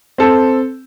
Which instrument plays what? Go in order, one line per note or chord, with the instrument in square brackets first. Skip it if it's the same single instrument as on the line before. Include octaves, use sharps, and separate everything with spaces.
[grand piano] C4 A4